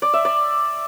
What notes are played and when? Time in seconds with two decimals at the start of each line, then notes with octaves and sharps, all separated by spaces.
0.02 D5
0.13 E5
0.25 D5